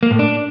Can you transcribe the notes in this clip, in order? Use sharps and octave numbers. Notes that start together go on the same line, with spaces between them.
A#3
A2
D4